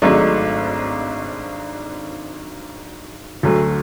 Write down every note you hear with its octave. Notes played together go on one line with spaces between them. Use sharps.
G#1 G#2 F#3 A3 D4
D2 D3 F#3 A3